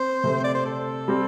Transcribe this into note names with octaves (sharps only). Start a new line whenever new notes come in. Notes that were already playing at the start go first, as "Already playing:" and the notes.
Already playing: C4 C5
C3 A3 C4
D5
C5
A4
G3 C4